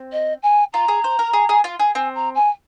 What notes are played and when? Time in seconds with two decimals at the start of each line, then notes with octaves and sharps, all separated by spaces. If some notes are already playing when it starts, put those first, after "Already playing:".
Already playing: C4
0.12 D#5
0.43 G#5
0.73 F4 A#5
0.88 G#4
1.04 C5
1.19 A#4
1.33 G#4
1.49 G#4
1.64 F4
1.79 G#4
1.94 C4 G#5
2.15 A#5
2.35 G#5